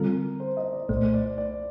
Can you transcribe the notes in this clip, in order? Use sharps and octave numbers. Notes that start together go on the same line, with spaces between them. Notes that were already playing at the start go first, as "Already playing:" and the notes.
Already playing: D3 G3 C4 F4 A4 A#4
C5
D#5
D5
C2 A#2 A3 C5
D5
D5